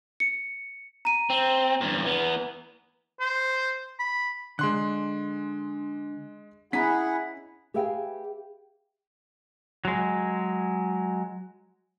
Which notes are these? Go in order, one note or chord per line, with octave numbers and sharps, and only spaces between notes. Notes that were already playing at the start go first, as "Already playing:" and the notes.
C#7
A#5 D#7
C4
E2 G2
E3 B3
C5
B5
D3 G#3 C6 F#6
C#4 E4 G#4 D#5 F#5 A#5 B6
G4 G#4 B4 E5 F5 G5
F#3 G#3